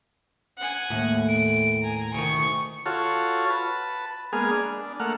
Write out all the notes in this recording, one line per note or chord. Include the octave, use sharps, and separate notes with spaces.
F#5 G#5
D#2 A2
D7
G#5 A#5
D2 D#3 C#6
F4 F#4 A4 C#5
B4 A5
G#3 A#3 B3 G#4 F6
D4
A3 A#3 F#5 F6